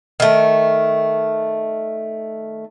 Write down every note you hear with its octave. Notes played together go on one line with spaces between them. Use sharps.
D#3 A3